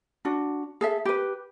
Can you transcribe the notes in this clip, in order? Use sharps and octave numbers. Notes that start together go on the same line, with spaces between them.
D4 F#4
G#4 A4 E5
G4 B4